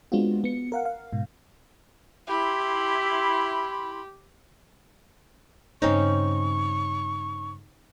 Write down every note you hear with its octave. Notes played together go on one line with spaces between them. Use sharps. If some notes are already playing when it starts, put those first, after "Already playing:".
G#3 B3 C4 D4 F4 F#4
B3 C#7
A#4 F5 F#5
F5
G#2 B2
E4 G4 B5 C6
G2 C#3 C4 C#4 D#4 C#6